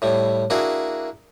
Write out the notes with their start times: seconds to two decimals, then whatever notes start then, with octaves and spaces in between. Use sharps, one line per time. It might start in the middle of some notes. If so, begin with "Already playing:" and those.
0.02 A2 G3
0.50 A#3 D4 E4 F#4 G#4